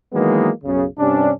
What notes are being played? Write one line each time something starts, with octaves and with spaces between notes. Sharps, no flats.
D#3 E3 F#3 G#3 A#3 B3
B1 F#2 C#3
G2 C3 C#4 D4